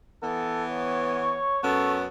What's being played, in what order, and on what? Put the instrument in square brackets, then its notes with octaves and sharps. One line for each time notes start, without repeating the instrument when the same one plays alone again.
[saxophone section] E3 B3 [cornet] A4
[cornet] C#5
[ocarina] C#6
[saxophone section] F#2 B3 C#4 [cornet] A4